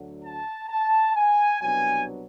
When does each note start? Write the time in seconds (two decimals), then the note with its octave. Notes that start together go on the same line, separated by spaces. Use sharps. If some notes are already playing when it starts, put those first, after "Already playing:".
Already playing: D2 D3 F#3
0.23 A5
0.68 A5
1.15 G#5
1.60 C2 B2 F#3 B3 D4 G#5